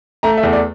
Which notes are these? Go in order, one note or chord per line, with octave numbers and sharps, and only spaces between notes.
A3 A#5
E5
E2
D5